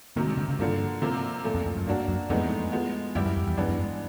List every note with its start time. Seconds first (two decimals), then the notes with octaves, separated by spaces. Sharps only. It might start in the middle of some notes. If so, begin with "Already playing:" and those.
0.16 C3 D#3 F#3 A#3
0.27 G#3
0.38 D3
0.49 C#3
0.59 G2 D3 F3 A#3
1.02 C3 F3 A#3
1.44 A#2 F3 A3
1.55 F2
1.66 F2
1.76 F#2
1.87 G2 F#3 A#3 D4 F#4
2.08 F#2
2.29 F2 A2 E3 G#3 B3 D#4
2.72 F3 G#3 B3
3.15 F#2 G3 B3 E4 G4
3.26 F#2
3.36 F2
3.47 E2
3.57 F#2 E3 G#3 B3 D4
3.68 F#2
3.79 G2